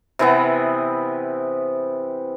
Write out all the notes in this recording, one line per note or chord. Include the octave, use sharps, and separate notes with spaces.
C3 E3 B3